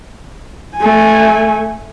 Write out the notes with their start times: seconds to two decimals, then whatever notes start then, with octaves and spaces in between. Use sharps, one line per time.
0.77 A3 G#5